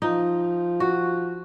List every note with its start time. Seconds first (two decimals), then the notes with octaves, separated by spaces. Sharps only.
0.02 F3 D#4
0.80 F#4